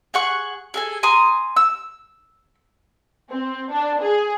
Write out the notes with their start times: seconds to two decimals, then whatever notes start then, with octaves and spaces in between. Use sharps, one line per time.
0.14 G#4 F#5 C#6
0.74 G#4 A4 G#5
1.03 G#5 A#5 C6 D#6
1.56 E6
3.31 C4
3.70 D4
4.02 G#4